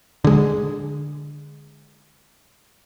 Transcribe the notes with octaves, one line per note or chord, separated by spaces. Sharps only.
D3 G#3